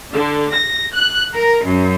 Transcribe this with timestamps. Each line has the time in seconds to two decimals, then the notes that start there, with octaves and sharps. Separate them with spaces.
0.13 D3
0.52 A#6
0.92 F#6
1.34 A#4
1.64 F#2